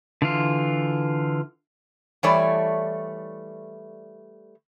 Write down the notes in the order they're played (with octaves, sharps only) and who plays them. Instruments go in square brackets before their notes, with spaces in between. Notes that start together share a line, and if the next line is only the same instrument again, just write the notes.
[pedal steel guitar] D3 E3 F4
[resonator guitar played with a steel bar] E3 G3 A3 C#5 D5